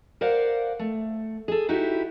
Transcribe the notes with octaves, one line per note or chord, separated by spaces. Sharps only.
A#4 C5 D5 F5 F#5
A3
G#4 A4
D#4 E4 F#4 G4